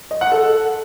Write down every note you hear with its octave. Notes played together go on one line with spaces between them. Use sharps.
D#5
F#5
A4